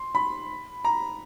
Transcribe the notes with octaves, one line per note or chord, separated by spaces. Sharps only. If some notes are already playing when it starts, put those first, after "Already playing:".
Already playing: C6
B5
A#5